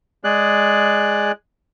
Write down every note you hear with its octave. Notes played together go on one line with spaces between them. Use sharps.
G#3 G#4 D5 F#6